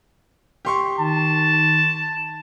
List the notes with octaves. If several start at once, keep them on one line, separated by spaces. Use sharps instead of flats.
G4 C6 C#6
D#3 A5